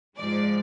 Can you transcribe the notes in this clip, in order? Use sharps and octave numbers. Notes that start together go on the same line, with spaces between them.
G#2 F3 G#3 D5